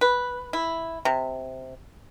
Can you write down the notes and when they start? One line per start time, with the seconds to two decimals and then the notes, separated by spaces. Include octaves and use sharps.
0.01 B4
0.53 E4
1.05 C3